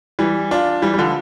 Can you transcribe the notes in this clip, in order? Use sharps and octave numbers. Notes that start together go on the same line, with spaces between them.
E3 G3
D4 F4
E3 G3
G3
D3 F3